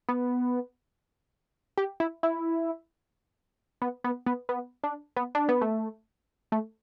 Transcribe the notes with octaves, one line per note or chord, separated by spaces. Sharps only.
B3
G4
E4
E4
B3
B3
B3
B3
D4
B3
D4
B3
A3
A3